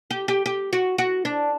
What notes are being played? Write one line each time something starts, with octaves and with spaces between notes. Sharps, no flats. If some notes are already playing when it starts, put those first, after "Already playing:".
G4
G4
G4
F#4
F#4
D4